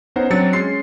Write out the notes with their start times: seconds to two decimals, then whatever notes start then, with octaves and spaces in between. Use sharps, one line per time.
0.16 B3 C#4 D#4 C5 F#5 A#5
0.30 F#3 C4 D4 F#5 A6 C#7
0.53 G#3 C#4 C6 C7